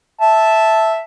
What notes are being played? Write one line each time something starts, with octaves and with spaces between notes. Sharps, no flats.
E5 A5